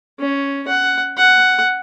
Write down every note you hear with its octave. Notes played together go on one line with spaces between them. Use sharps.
C#4
F#5
F#5